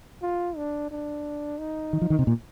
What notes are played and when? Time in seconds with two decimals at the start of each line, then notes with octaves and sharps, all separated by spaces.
0.23 F4
0.57 D4
0.91 D4
1.59 D#4
1.93 D#3
2.02 F3
2.10 D#3
2.19 C3
2.27 A#2